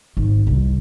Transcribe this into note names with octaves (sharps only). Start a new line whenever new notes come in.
G#1
C2